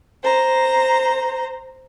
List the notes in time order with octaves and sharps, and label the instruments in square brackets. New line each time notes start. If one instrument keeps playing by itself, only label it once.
[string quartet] C5 A#5